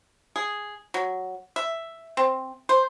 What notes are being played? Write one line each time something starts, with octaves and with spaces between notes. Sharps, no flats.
G#4
F#3
E5
C4
C5